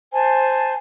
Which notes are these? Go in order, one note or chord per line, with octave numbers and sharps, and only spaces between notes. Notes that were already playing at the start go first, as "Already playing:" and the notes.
C5 G#5 A5